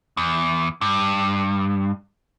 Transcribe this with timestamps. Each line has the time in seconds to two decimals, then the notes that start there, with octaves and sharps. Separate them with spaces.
0.17 E2
0.81 G2